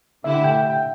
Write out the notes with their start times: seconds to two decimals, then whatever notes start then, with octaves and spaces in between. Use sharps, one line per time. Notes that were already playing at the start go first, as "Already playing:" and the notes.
0.24 D3 A3 E4 G4 E5
0.34 F#5
0.44 G5
0.54 G5
0.70 G5